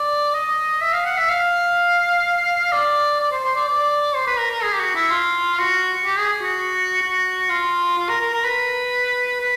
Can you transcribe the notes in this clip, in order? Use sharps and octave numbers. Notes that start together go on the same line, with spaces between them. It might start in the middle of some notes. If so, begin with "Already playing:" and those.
Already playing: D5
D#5
E5
F5
F#5
E5
F5
D5
D5
C5
C5
D5
D5
C5
B4
A#4
A#4
G#4
G4
F#4
E4
F4
F#4
G4
G#4
F#4
F#4
F4
F4
A#4
A#4
A#4
B4
B4